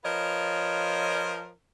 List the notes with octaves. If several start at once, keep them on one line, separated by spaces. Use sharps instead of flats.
F3 F4 A#4 B4 C#5 D#5